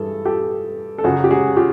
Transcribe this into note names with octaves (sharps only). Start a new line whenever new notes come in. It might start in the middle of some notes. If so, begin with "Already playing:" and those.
Already playing: G2 E3 G#4 A4
G4 A4
A4
F#2 C#3 F#3 F#4 G#4
G4
F#4 G#4
F4 G4